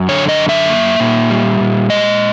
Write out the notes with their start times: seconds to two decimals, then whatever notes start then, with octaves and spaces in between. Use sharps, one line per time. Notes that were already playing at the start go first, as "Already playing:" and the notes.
Already playing: F#2
0.09 D3 C#5
0.29 D#5
0.39 F#2
0.49 E5
0.69 A#3
1.00 A#2
1.30 G3
1.60 A#2
1.90 G#3 D#5